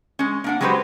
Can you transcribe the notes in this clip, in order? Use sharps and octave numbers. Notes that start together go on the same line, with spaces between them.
G#3 C#4
A#3 D4 F#5
F#3 G#3 F#4 G4 B4 C5